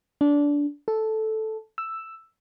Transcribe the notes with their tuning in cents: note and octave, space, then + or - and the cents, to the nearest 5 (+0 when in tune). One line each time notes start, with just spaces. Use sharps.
D4 -20
A4 -5
E6 +5